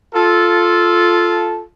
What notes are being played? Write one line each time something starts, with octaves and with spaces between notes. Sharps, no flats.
F4 A4